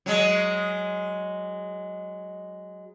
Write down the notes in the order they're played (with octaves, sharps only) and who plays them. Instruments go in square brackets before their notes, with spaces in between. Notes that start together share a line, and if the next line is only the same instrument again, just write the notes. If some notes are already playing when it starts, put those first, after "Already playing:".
[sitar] F#3 G#3